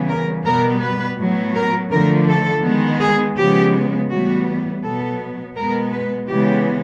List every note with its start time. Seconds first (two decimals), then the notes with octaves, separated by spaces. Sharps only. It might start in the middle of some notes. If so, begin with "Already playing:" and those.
Already playing: C#3 E3 G3 B3
0.08 A#4
0.45 B2 G3 B3 A#4
0.81 B4
1.18 A2 F#3 B3
1.54 A#4
1.91 D3 F3 A3 A#4
2.28 A4
2.64 D#3 G#3 B3
3.00 G#4
3.37 C#3 F3 G#3 B3 G4
4.09 A2 E3 G3 B3 F#4
4.83 B2 F#3 B3 A4
5.55 B2 G#3 B3 A#4
5.92 B4
6.28 C#3 E3 G#3 B3 G4